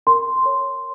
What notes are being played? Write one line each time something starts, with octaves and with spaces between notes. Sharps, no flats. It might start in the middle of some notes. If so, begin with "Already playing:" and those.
A#4 C6
C#5